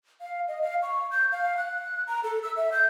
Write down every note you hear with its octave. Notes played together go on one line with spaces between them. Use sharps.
F5
D#5
F5
C#6
G6
F5
F#6
A#5
A4
E6
E5
G6